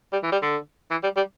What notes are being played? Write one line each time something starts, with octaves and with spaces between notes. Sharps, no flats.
G3
E3
G3
D3
E3
G3
G3